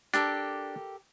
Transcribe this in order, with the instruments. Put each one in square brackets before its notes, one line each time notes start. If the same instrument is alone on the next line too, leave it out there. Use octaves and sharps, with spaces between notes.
[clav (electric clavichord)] D4 [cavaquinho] G4 A4 A#4